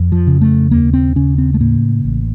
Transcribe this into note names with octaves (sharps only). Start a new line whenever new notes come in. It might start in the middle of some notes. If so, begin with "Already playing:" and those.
Already playing: F2
F3
C#3
A3
D#2 A#3
C4
C#3 C#4
C4
A3
A2 A#3
A1